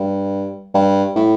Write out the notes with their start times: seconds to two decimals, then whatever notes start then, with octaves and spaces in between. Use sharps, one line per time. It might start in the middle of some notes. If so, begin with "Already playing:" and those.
Already playing: G2
0.74 G2
1.16 A2